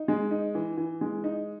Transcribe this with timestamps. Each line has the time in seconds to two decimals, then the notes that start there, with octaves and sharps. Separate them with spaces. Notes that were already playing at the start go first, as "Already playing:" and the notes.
Already playing: D#4
0.08 G#3
0.31 D#4
0.55 E3
0.77 E3
1.01 G#3
1.24 D#4